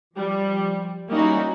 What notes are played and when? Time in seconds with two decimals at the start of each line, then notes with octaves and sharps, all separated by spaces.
0.15 F3 G3
1.09 G3 A#3 C#4 D#4 E4 F#4